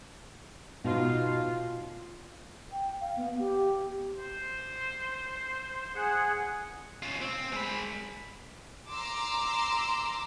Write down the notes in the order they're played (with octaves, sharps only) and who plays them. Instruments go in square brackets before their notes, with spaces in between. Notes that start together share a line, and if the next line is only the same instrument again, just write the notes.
[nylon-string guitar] B2 D#4 [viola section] F4
[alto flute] G5
F5
B3
G4
[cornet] C5
[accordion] G#4 F#5
[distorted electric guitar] C#4 F4
C4
G#3 B5
[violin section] A#5 C6 D6 E6